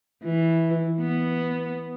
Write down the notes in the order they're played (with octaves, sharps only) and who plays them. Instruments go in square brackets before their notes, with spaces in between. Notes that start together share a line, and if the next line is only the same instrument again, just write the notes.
[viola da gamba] E3
B3